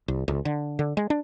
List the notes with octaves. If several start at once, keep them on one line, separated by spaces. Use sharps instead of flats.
C2
C#2
D3
D3
G#3
D4